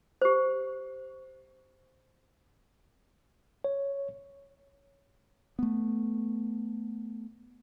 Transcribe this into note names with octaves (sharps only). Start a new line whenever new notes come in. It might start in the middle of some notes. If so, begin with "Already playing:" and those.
G4 C5
C#5
A3 B3